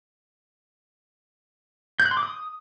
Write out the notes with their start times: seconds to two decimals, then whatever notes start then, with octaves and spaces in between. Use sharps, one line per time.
2.00 G6
2.05 F#6
2.11 C6
2.17 D6
2.23 D#6